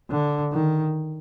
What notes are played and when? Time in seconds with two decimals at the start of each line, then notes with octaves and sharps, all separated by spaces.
0.11 D3
0.52 D#3